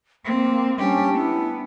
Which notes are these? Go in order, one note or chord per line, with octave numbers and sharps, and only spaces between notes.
A#3 C4
G3 C#4 D4 G4
B3 E4